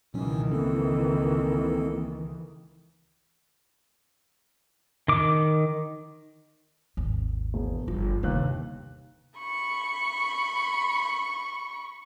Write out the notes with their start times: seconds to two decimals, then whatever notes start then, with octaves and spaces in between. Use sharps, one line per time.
0.14 C#2 B2 D#3 E3 F#3 C#4
0.52 A#3 C4 A4
5.08 D#3 D6
6.97 G#1 D#2
7.54 E1
7.88 G1 F3
8.23 G1 D#2 C3 F#6
9.39 B5 C#6